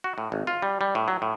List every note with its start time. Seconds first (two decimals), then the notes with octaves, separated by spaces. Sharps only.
0.04 F#4
0.18 A2
0.32 G#1
0.47 F4
0.62 G3
0.81 G3
0.95 A2
1.08 F#3
1.22 A2